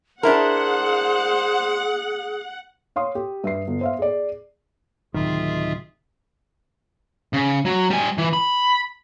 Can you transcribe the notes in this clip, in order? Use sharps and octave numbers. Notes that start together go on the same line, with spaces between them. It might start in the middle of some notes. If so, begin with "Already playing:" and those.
D4 E4 G#4 A#4 C5 F#5
C#5 F5 C6 D#6
G4
G2 E5 C7
G1
C5 E5 F5
G#4 D5
D1 C3 D#3 F#3 F4 G#4 E5
C#3
F#3
G3 G#5
E3
B5